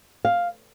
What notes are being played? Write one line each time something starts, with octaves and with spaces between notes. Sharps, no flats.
F5